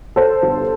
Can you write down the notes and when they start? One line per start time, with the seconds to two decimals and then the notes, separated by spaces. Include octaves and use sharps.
0.16 A4 C5
0.42 G1 G2 D3